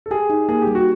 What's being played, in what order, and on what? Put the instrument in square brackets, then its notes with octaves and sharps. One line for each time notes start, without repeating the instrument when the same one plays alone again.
[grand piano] A4
[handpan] G4 [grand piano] G#4
[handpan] D#4
[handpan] A#3 [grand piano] G#4
[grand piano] G4
[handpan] G3
[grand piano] F#4